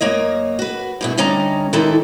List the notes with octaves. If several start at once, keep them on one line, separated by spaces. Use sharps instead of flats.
F#2 A#3 C#5 D#5
F#4 B4
G2 B2 E4
D3 G3 C#4 D#4 A#5
D#3 E3 F#3 G#3 E4 A4